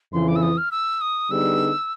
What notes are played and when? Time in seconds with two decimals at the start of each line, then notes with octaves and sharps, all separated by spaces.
0.13 F2 C#3 E3 C6
0.28 D6
0.36 E6
0.42 D#6
0.57 F6
0.71 E6
1.01 D#6
1.30 D3 G3 B3 D#4 G#4 E6